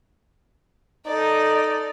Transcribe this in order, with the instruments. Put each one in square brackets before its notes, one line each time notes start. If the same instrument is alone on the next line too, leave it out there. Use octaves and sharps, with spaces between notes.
[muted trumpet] D#4 [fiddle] A4 D5